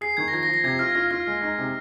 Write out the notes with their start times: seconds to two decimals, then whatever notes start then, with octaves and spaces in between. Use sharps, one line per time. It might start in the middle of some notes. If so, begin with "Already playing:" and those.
0.01 G#4 C7
0.17 D#3 G#6
0.28 A#6
0.32 F3 G#6
0.43 A#6
0.49 F3
0.54 A#6
0.64 C3 G#6
0.79 F4 F6
0.95 F4 A#6
1.11 F4 F6
1.27 G#3
1.42 D#4
1.58 C3